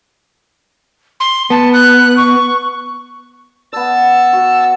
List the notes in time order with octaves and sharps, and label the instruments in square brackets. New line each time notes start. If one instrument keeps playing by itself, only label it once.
[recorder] C6
[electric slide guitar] B3 [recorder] A5
[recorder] F#6
C#6
[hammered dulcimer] B3 D5 [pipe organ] A5 E6
[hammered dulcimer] F#4 F#5